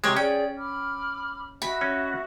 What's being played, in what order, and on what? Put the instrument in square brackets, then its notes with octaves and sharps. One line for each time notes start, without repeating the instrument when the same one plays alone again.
[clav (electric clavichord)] C3 G#3 [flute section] F#4 D#5 C#6 [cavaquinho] G4 C#5
[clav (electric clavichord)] C#4 [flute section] G#4 D5 [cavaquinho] G5
[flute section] B5 D6 F6
[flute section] F#4 D#5 E5 [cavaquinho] B5
[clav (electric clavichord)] C#4